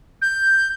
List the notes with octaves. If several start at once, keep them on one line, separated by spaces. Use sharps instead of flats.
G6